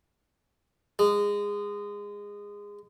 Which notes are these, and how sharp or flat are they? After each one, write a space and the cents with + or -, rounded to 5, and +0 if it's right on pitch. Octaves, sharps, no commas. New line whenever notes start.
G#3 -20